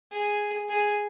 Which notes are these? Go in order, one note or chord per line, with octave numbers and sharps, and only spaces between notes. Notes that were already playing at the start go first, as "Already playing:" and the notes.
G#4
G#4